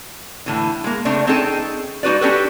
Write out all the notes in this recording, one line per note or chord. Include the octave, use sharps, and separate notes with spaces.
A2 D3 E3
G#3 A#3
C#3 A3 C4 D4
C4 C#4 D#4 G#4 A4 G5
G#3 D#4 F#4 B4 D5
C#4 D4 F#4 G4 A4 B4